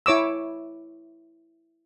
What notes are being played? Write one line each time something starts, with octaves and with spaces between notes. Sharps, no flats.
E4 C#5 D6 E6